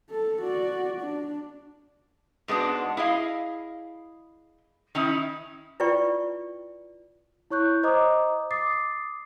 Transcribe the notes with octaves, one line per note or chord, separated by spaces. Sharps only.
A4
F#4 D5
D4
G#2 G#3 B3 D4 F#4
E4 G#4 D#5 F5
D#3 C#4 D#4 E4
E4 F4 B4 D5 G5 C#6
E4 C#5 C#6 F#6 G6
C5 D#5 A#5 D6 D#6
D6 D#6 A6 C7